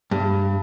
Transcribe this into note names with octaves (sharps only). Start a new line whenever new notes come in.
G2